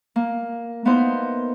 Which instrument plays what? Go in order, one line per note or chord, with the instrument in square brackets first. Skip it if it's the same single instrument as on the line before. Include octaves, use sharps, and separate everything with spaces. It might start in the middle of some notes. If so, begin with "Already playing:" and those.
[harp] A#3
A#3 B3 D#4 E4 C5 C6